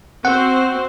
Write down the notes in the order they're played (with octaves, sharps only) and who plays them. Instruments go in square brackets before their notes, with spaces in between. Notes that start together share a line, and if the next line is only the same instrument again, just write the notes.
[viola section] C4 F#4 C5 [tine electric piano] F#5